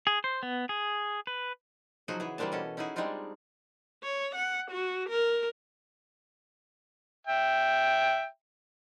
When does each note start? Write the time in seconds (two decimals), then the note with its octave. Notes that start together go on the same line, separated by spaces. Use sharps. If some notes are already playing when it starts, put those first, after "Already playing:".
0.07 G#4
0.24 C5
0.43 B3
0.69 G#4
1.27 B4
2.08 C#3 F3 F#3 D#4 F#4 G#4
2.20 E3 G#4
2.38 E3 G3 A#3 C4 D4 A5
2.52 B2 C#4 A4
2.77 C#4 D#4 E4 F#4 G#4
2.96 G3 G#3 C4 D4 D#4 F4
4.03 C#5
4.36 F#5
4.71 F#4
5.09 A#4
7.27 E5 G5